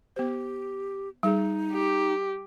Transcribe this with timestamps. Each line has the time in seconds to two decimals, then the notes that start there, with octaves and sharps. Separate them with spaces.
0.16 B3 G4 C5
1.23 G3 D#4 G#4
1.73 G4